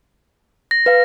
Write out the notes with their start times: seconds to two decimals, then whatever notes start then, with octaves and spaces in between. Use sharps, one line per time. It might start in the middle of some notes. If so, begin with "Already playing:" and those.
0.71 A#6
0.86 B4 F5